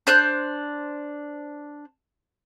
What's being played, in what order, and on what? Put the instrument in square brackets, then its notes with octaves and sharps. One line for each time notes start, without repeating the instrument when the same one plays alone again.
[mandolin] D4 C5 F#6 G6